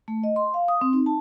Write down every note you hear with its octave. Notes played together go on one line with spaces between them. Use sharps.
A3
D#5
C6
F5
D#6
C4
D#4
A5